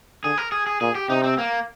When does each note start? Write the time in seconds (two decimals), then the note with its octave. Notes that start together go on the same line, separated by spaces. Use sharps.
0.24 D3 G#4
0.38 A#4
0.52 G#4
0.67 G#4
0.81 A#2 G#4
0.95 G4
1.09 C3 D#4
1.24 C4
1.38 A#3